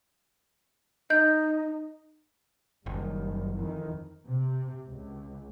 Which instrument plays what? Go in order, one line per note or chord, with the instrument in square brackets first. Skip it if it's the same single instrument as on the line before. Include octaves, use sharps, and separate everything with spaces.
[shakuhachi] D#4 [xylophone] D#5 G6
[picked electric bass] F#1 [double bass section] F#2 D#3 G3
[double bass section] F2 D#3 E3
C3
C#2